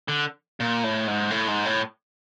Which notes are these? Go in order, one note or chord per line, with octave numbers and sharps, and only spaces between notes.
D3
A#2
A2
G#2
A2
G#2
A2